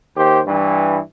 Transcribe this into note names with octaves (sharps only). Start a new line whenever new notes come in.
D#2 G4 C5
G2 E3